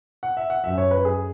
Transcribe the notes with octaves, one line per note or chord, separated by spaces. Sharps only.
F#5
E5
F#5
F#2 E5
C#5
B4
G#4